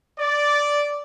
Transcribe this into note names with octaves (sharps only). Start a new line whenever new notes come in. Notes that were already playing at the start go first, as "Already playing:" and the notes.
D5